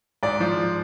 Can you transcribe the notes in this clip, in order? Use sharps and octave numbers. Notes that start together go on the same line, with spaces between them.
G#2 D5
F3